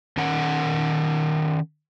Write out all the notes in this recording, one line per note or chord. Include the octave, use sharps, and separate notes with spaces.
D#3 C#4 A#4 F#5